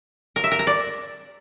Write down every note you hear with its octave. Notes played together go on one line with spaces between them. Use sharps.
A#4
E5
A#4
A#5
D5